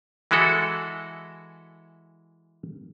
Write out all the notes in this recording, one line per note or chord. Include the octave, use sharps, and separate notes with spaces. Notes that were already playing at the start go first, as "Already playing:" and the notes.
E3 G#3 E4 F#4 A4